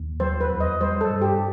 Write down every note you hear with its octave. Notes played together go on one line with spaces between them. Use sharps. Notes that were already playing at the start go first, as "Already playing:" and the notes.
Already playing: D#2
F#3 C5
B4
E2
D#5
G3 C5
A4
G2
G4